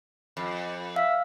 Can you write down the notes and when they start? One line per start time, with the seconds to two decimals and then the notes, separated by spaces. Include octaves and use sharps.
0.37 F2
0.96 E5 F5